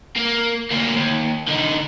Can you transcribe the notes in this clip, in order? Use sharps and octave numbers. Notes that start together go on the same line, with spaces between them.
A#3
D2 A#3
D#2
D3 D#4